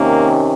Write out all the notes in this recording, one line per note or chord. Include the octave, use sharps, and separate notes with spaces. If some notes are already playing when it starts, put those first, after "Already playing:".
Already playing: C3 D#3 A#3 C#4